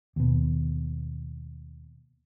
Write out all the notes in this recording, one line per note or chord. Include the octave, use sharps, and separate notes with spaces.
D#2 B2